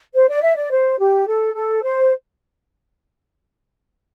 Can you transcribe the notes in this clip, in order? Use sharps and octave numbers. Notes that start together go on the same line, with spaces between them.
C5
D5
E5
D5
C5
G4
A4
A4
C5